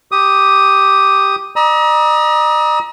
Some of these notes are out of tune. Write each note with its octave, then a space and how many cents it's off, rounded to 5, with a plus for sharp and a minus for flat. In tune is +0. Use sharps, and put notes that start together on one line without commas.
G4 +0 D#6 +0
D#5 -45 A#5 +30 D#6 +45